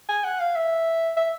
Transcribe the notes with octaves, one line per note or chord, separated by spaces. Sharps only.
G#5
F#5
F5
E5
E5